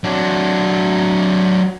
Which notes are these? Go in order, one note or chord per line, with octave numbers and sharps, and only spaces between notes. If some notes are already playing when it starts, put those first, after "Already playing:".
F#3 D4